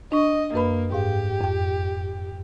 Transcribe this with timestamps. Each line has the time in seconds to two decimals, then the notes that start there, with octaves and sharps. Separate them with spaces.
0.12 D4 D#5 C#6
0.54 F#2 A#3 B4 B5
0.92 G#2 G4 F5
1.41 F2 G5